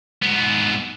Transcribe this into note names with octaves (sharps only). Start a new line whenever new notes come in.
G#2 B3